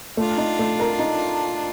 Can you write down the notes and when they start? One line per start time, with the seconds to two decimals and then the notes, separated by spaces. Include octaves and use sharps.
0.17 A3 D4 F4
0.38 D#4
0.59 A3
0.80 A#4
0.99 D#4